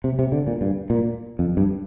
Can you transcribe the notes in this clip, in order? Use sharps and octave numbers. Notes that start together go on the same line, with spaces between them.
C3
C3
D3
A#2
G2
A#2
F2
G2